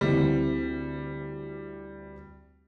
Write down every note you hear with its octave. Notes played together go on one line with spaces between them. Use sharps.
D2 E3 G3 C4